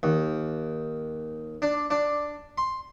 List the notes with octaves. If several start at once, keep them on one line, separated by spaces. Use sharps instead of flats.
D#2
D4
D4
C6